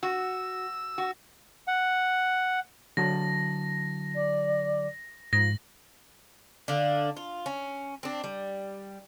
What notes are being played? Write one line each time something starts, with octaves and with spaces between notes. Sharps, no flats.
F#4 E6
F#4
F#5
D3 F#3 A5 A#6
D5
G#2 F3 A#6
D3 D4 F5
F4
C#4
C4 D4
G3